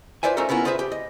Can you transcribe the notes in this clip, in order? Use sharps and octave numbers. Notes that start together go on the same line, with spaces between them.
F4 B4 C5 D5 E5 G#5
A3 C#4 D#4 F4 A4 A#4
B3 C#4 E4 F4 A#4
F4 G#4 B4 C5 E5
G4
D#5